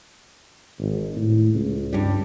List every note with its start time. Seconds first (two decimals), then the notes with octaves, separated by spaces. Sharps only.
0.79 G#1
1.16 A2
1.54 C#2
1.93 G2 G3